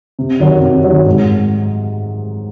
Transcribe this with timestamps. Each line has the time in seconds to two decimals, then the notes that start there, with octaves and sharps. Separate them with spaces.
0.19 C3
0.40 D#3 F#3
0.62 C3
0.84 D#3 F#3
1.06 G#2